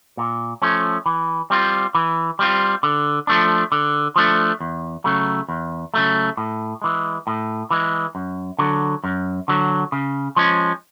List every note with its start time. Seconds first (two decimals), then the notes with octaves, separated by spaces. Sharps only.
0.17 A#2
0.62 F3 A3 C#4
1.06 E3
1.50 G3 C4 F4
1.95 E3
2.39 G3 C4 F4
2.83 D3
3.27 F3 A3 D4
3.72 D3
4.16 F3 A3 D4
4.61 E2
5.04 C#3 F#3 A3
5.49 E2
5.94 C#3 F#3 A3
6.37 A2
6.82 E3 G#3
7.27 A2
7.71 E3 G#3
8.15 F#2
8.59 D3 F#3
9.04 F#2
9.48 D3 F#3
9.92 C#3
10.36 F3 G#3 C#4